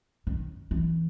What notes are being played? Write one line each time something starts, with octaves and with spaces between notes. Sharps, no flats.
D#3
E3